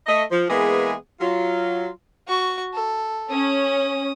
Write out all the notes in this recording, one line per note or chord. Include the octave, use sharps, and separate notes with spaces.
A3 D#5
F3
E3 G#3 A#3 B3 G#4
F#3 F4
F#4 C#6
A4
C#4 D#6